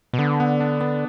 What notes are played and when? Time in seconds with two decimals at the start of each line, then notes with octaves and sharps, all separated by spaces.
0.13 B2
0.18 D3 B3
0.40 B3
0.60 D4
0.81 B3